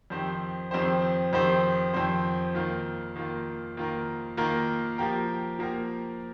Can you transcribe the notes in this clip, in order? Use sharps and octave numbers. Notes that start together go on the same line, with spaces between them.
F2 D#3 C4 G4 C5
F2 D#3 C4 G4 C5
F2 D#3 C4 G4 C5
F2 D#3 C4 G4 C5
D#3 A#3 F4 A#4
D#3 A#3 F4 A#4
D#3 A#3 F4 A#4
D#3 A#3 F4 A#4
F3 A#3 G4 A#4
F3 A#3 G4 A#4